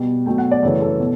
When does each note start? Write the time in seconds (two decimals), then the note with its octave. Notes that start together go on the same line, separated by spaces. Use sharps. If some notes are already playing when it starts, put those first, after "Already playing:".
Already playing: B2 G3
0.26 B2 F#3 A3 G5
0.38 F#5
0.51 D5
0.63 F#2 C#3 E3 A3
0.82 A4
1.00 B2